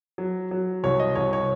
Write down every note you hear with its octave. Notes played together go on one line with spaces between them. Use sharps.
F#3
F#3
C2 C#5
D#5
C2 C#5
C#5